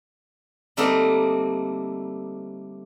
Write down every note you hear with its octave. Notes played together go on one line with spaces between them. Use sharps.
D3 G3 A3 A#3 C4 D#4